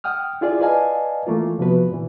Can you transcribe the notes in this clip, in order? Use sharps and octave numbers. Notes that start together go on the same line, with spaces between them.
F#5 G5 D#6 F6
E4 F4 G#4 D5
B4 D5 D#5 F5 G#5 A5
E3 A3 A#3 F4
C3 F3 B3 F#4 B4
A#2 E3